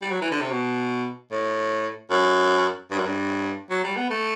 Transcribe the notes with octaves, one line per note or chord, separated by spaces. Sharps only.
G3
F#3
E3
D3
C3
B2
A2
F#2
G2
F#2
G2
F#3
G3
B3
A3